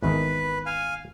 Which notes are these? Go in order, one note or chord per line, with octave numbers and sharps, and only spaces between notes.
G#1 E2 D#3 B4
F5 G#5